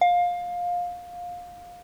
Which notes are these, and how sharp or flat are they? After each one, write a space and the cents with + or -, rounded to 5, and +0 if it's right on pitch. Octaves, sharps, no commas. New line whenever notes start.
F5 +20